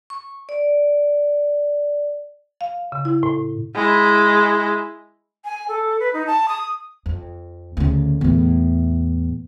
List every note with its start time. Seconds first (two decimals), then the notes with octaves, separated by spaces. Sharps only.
0.10 C#6
0.49 D5
2.61 F5
2.92 C#3
3.05 E4
3.23 A2
3.75 G#3 E4
5.45 G#5
5.69 A4
6.00 B4
6.14 D#4
6.27 A5
6.48 D#6
7.06 F2
7.77 D2 C#3
8.21 E2 A2